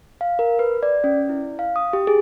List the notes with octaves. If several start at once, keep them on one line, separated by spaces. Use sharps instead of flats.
F5
A#4
B4
D5
C#4
E4
F5
D#6
G4
G#4